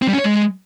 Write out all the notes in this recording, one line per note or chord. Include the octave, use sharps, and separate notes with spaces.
C4
G3
C#4
C#5
G#3